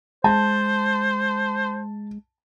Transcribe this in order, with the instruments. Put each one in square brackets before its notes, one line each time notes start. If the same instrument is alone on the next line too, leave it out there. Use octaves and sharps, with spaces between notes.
[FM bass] G#3 [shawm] C5 [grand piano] A5